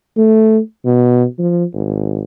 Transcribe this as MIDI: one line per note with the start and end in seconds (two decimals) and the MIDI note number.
0.17 0.59 57
0.85 1.25 47
1.39 1.64 53
1.73 2.24 32